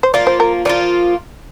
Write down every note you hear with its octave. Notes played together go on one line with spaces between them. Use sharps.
C5
F3 A#3 F4 D5
C5
A#4
F3 A#3 F4 D5